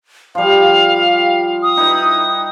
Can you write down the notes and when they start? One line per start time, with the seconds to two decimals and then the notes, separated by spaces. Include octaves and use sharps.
0.35 F3 G3 F5
1.63 D#6
1.77 D#4 E4 B4